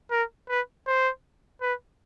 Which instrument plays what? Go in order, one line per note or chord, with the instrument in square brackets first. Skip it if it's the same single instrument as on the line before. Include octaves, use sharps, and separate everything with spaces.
[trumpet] A#4
B4
C5
B4